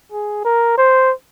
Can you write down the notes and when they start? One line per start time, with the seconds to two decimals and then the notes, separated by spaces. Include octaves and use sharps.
0.12 G#4
0.45 A#4
0.77 C5